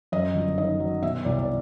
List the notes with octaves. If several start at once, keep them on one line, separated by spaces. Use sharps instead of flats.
F#2 D#5
G1
D#3 D#5
F#3
B2 E5
C2 D5
D5